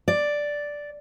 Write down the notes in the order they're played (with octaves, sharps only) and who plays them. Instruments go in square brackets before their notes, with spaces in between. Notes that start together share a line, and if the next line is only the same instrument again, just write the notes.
[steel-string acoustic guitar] D5